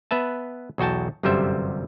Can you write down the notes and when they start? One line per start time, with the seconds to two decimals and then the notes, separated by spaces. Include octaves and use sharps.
0.11 B3 B4 E5 A5
0.78 B1 E2 F#4 G5 A5
1.23 G1 F#2 C3 G3 C5 E5